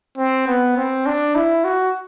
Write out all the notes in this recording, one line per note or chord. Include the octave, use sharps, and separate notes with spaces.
C4
B3
C4
D4
E4
F#4